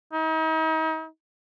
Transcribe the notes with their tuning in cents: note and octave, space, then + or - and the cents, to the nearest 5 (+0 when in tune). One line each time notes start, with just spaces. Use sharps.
D#4 +40